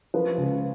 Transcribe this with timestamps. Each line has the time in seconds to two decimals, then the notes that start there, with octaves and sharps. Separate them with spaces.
0.14 F3 B4
0.37 C#2